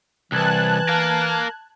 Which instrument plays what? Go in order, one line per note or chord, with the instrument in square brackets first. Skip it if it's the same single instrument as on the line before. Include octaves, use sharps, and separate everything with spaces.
[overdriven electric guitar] C2 [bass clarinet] E3 [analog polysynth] A5 F#6 G#6
[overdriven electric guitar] A#4 F5